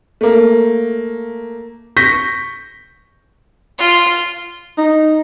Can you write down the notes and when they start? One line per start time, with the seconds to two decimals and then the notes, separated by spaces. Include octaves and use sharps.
0.21 A3 A#3
1.97 C#6 G6 A#6 B6
3.79 F4
4.78 D#4